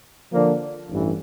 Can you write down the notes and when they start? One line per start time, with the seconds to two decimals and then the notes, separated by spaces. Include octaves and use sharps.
0.32 D3 F3 A#3 D4
0.91 A1 G2 E3